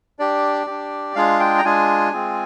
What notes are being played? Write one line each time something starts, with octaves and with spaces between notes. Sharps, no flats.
D4 G4 D5
D4 G4
G#3 D4 F4 G#4 F5
G5
A#5
G#3 D4 F4 G#4 G#5
G#3 C4 F4 G#4